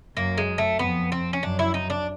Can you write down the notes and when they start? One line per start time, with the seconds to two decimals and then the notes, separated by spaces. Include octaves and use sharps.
0.16 F#2 A#3
0.38 G#3
0.58 A3
0.79 F2 B3
1.12 C4
1.33 C#4
1.43 F#2 D4
1.59 E4
1.74 D#4
1.90 D4